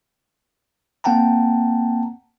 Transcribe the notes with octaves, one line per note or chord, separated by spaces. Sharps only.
A#3 C4 F#5 G5 A5 A#5